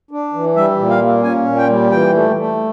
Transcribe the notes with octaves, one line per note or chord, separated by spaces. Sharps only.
D4
E3
G3 E5
A#2
F5
A#3
C#4 G#5
A#2
G5
G3
E3 G5
A3
A3